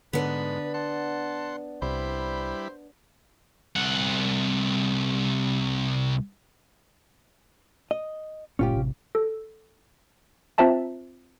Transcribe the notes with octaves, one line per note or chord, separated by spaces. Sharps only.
G#2 D3 B3 D4 B4
F#5 A5 C6
C2 G3 E4 C5 B5
C2 F#5
D#5
G1 A#2 G#3 C#4 F4 G4
A1 C3
A4
C4 F4 C5 E5 A5 A#5